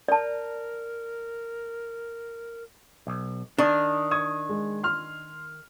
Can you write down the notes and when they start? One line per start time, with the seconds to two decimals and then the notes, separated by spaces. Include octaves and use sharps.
0.08 A#4 D5 A5
3.07 B1
3.58 D#3 D4
4.11 C#6 D#6 G#6
4.49 G#3
4.83 C6 F6